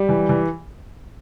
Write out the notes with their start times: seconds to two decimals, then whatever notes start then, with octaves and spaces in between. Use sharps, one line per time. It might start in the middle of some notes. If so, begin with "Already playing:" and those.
Already playing: G3 G4
0.09 E3
0.29 E3